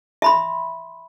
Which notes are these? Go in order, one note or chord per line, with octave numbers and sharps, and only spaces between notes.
E5 B5 C6